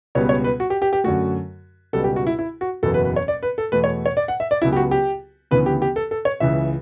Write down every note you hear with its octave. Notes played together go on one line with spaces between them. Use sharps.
C#2 B2 G3 B3 C#5
C#5
B4
F#4
G4
G4
G4
F#2 D3 A3 F#4
C#2 B2 G3 A4
G4
F#4
E4
E4
F#4
F#1 E2 B2 F#3 A4
B4
B4
C#5
D5
B4
A4
E2 B2 A3 B4
C#5
C#5
D5
F#5
E5
D5
C#2 C#3 F#3 B3 E4
G4
F#4
G4
D2 C#3 E3 B3 B4
G4
G4
A4
A4
C#5
C#2 C#3 E3 E5